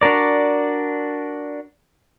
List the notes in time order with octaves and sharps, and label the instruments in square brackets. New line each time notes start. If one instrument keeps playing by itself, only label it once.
[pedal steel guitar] D4 F#4 A#4 D5